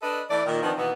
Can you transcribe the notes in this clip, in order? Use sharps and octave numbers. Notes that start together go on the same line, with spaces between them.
D4 A4 B4 D#5
E3 A3 D5
A#2 D#3
D#3 F3 B3 C4 D4
B2 D#3 E3 A#3 B3